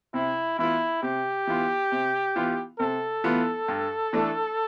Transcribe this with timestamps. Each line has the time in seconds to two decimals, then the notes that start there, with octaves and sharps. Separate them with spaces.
0.14 C3 E4
0.59 E3 B3 E4 F4
1.03 C3 G4
1.47 E3 B3 F4
1.92 C3
2.36 E3 B3 F4
2.80 C3 A4
3.24 E3 B3 F4
3.68 G2
4.13 E3 A3 D4